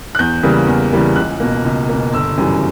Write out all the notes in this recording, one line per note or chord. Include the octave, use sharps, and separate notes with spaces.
F#6
E2 G6
C#3 E3 G3 A#3
E2
C#3 E3 G3 A#3
C#2 F#6
B2 A#3
C#2
B2 A#3
G1 E6
F#2 C#3 E3 G3